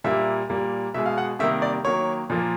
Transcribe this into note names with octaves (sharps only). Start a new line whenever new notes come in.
A#2 G3 A#3 E5
A#2 G3 A#3
B2 G#3 E5
F5
F#5
C3 D#3 G3 A#3 E5
D5
D#3 F#3 A#3 C#5
A#2 F3 A#3